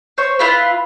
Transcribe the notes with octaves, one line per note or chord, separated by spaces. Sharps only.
C5 C#5
E4 F4 B4